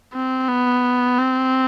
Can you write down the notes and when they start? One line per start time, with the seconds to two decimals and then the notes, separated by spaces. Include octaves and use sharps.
0.13 C4
0.49 B3
1.19 C4